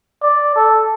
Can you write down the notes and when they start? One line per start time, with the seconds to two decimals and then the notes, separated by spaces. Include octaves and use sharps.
0.22 D5
0.56 A4